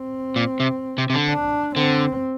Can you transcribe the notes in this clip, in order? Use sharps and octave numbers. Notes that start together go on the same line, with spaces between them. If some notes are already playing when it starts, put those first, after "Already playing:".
Already playing: C4
A#2
C3
C3
C3
D3
D4
D3 C4